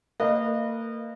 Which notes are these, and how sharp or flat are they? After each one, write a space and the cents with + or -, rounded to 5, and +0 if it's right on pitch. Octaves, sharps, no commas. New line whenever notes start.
A#3 -35 B4 -15 D#5 -25